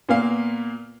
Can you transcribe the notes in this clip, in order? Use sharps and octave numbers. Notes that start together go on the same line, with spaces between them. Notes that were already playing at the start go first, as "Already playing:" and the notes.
A#2 A#3 B3 F5